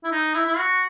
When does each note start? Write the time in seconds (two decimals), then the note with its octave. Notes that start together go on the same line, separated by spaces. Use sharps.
0.04 E4
0.11 D#4
0.34 E4
0.46 E4
0.58 F#4